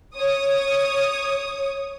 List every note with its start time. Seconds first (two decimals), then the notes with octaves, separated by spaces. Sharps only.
0.16 C#5 D#6